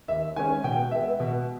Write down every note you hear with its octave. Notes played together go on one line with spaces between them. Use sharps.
D#2 E5
D#3 G#3 C#4 G#5
B2 G5
G#3 B3 E5
B2